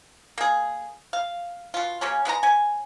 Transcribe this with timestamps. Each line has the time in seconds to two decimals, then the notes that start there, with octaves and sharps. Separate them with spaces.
0.38 A#3 G#4
1.13 F5
1.74 B2 F4
2.01 C#3 F#3 A#3 C#4
2.25 G#3 B3 F4 A#5
2.43 C#4 G#5